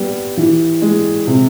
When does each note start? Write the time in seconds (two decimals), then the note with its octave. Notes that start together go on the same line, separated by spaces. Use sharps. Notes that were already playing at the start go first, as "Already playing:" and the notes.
Already playing: G3 B3
0.37 E3
0.82 G#3
1.27 C3